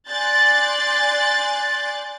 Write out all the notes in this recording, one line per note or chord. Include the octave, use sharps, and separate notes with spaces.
D5 G#5 C6 F#6 G6 A6